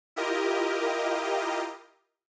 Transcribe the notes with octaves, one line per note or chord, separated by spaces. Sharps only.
E4 F4 G4 A#4 D#5